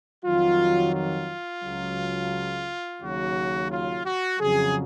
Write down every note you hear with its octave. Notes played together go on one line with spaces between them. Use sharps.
F2 D#3 F#3 F4
F4
C#2 C#3 F#3
D#2 C#3 F#3 F#4
F4
F#4
F2 C#3 F#3 G#4